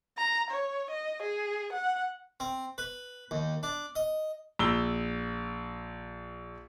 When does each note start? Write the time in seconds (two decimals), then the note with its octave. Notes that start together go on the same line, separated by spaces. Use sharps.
0.18 A#5
0.51 C#5
0.91 D#5
1.22 G#4
1.73 F#5
2.40 C4
2.78 B4
3.31 D#2
3.63 D4
3.95 D#5
4.59 A#1 E6 G7